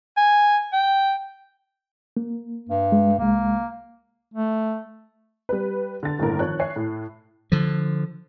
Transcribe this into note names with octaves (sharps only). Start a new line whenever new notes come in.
G#5
G5
A#3
G2
G#3
C2 G#3 A#3
A3
G3 B4
D3 A6
G1 A2 D3 D#3 A#3 A#4
D#3 F3 C#5 F#6
C#5 E5 G#5 C7
A2
D3 F3